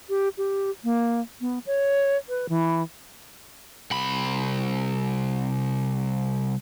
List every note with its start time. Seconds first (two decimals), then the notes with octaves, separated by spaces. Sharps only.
0.10 G4
0.38 G4
0.84 A#3
1.41 B3
1.67 C#5
2.29 B4
2.49 E3
3.91 C2 B5